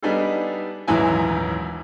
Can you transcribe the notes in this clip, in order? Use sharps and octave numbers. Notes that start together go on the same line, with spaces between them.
G3 B3 D4 D#4 G#4 A4
D#1 G#2 E3 F#3 E4 G#5